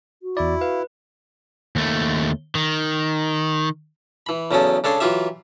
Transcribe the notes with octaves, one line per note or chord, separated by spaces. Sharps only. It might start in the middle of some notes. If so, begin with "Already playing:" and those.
F#4
E2 E4 D5
B4 F5
D#2 A3
D#3
E3 B5
E2 C#3 F#3 C#4 A4
C#3 D4 A4 C#5 C6
E3 F#3 F4 G4 E5